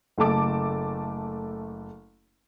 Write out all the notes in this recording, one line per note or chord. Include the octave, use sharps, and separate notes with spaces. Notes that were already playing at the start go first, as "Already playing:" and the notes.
F#1 A3 A4 A5 D6